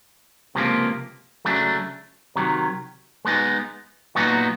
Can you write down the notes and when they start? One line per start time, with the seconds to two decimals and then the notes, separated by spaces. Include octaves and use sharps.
0.55 C#2 C3 F3 A#3
1.45 C#3 F#3 A3 D4
2.36 C3 D#3 F#3
3.25 G#3 B3 D#4
4.15 A#2 F#3 B3 D#4 F#4